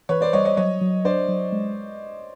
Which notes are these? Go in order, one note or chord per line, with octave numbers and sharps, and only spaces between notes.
E3 B4 C#5
C5 D5
G3 C#5 D#5
C#5 D#5
F#3 C#5 D#5
F#3
D4 C5 D5
F#3
G#3